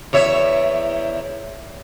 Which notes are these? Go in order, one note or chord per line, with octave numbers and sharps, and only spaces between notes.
E2 C#5 E5